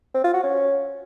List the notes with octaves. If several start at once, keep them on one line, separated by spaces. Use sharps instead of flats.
C4
F4
F#4
C#4